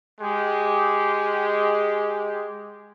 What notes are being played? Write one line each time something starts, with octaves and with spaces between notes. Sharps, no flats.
G#3 G4